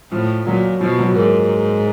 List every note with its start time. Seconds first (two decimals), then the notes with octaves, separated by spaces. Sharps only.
0.11 A2 F3
0.46 A#2 F#3
0.80 B2 F3
0.98 F#3
1.15 G#2 A#3